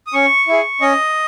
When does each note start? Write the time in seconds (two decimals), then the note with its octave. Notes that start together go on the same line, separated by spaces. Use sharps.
0.07 D#6
0.13 C#4 C#6
0.47 E4 G#4
0.81 C#4 D#5